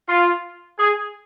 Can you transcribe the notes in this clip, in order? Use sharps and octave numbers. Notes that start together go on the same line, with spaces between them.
F4
G#4